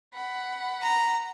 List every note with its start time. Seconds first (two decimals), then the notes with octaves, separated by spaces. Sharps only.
0.15 F#5 B5
0.82 A#5